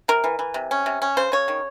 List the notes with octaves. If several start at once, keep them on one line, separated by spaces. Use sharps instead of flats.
C3 A#4
E3
E3
C3
C#4
C3
C#4
C#3 C5
C#3 C#5
D#3